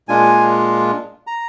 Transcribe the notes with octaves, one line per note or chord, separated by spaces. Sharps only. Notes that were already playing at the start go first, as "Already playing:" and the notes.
A#2 G#3 D4 F4 G#5
A#5